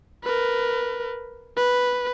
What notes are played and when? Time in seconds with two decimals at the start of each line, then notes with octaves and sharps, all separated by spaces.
0.24 A#4 B4
1.57 B4